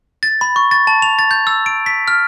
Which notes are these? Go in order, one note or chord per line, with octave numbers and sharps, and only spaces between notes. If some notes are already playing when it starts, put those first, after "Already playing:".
A6
B5
C#6
A6
A5
F7
A6
G6
E6
D7
B6
F6